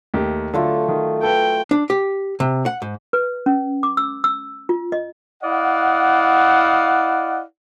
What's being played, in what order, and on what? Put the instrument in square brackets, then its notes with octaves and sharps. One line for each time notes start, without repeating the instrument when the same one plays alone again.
[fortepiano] D#2 A3 G4
[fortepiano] D3 [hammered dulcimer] F#3 A3 F4
[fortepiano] D#3
[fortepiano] A4 B4 [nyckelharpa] G5
[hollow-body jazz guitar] D4
G4
C3
F#5
G#2
[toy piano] B4
C#4
D6
E6
E6
F4
D#5
[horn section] E4 D5 D#5 F5 F#5